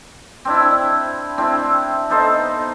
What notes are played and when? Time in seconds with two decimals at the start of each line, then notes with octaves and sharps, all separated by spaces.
0.45 C4 D4 E4
1.38 C4 D4 E4
2.10 B3 D#4 A4 C5